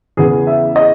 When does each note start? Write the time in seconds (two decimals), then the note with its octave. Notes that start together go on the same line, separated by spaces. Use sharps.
0.17 E2 C#3 E3 B3 G#4
0.47 E5
0.76 D#5